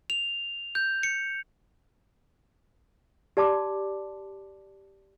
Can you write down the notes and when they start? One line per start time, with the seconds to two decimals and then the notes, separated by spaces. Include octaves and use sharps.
0.10 F7
0.75 G6
1.03 C#7
3.37 G4 D5 A5 C6 D6